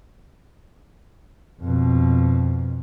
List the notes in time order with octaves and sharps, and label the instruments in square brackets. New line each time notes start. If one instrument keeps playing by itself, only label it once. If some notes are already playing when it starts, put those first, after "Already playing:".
[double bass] F2 B2